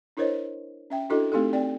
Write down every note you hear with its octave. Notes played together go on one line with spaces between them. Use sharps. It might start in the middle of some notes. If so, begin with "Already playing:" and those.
D4 E4 A#4 C5 C#5 D#5
C#4 E5 G5
D4 E4 F#4 A4 D#5
A3 C4 D#4 G4 A4
C4 D5 G5